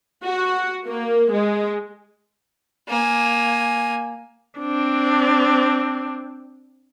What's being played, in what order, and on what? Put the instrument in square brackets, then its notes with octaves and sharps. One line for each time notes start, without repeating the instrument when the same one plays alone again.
[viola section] F#4
A#3
G#3
[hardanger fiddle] A#3 G#5
[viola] C4 D4